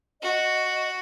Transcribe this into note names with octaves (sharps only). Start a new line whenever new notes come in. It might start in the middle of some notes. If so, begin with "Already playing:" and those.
F#4 D#5